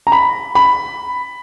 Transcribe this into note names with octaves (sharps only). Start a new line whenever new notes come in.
A#5
B5
B5